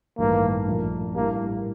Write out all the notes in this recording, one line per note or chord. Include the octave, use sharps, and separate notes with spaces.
A1 G2 D#3 A3 A#3
A#1 A#2 F3 A3 D4
A2 G3 A#3 D4 G4